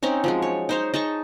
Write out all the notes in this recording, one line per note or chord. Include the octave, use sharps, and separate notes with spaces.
C4 C#4 D#4 C#5
F3 F#3 G#3
C#5
D#4 C5 C#5
D#4 G#4 A5 C#6